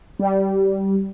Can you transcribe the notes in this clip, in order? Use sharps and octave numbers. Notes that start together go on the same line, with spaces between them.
G3